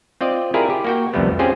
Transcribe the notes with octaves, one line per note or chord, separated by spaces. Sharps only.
C4 F4 D5 D#5
E4 F4 G4 G#4 A#4 D5
G4
A#3 F#4 G5
C2 F2 D3 G3 A3 B3
C4 C#4 F4 G4 G#4 C5